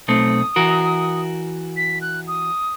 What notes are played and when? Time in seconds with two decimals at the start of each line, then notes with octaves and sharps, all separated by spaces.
0.08 B1 A3 C4 D#6
0.56 E3 F#4 A#4
1.77 B6
2.02 F#6
2.28 D#6